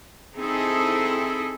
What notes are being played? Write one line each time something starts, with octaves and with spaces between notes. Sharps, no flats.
C4 D#4 E4 G#4 A4